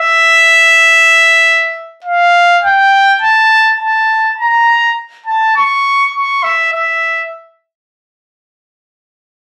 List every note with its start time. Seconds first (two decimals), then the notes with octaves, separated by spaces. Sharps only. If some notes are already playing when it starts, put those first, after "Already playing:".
Already playing: E5
2.04 F5
2.63 G5
3.21 A5
3.80 A5
4.38 A#5
5.26 A5
5.56 C#6
6.15 C#6
6.43 E5
6.72 E5